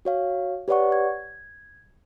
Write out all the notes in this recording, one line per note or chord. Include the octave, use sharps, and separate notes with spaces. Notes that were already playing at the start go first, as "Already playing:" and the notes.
F#4 C#5 F5
G4 B4 C#5 D5 F#5 C#6
G#6